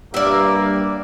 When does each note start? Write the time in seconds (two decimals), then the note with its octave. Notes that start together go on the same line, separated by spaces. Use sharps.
0.14 G2 G3 A#3 D5 E5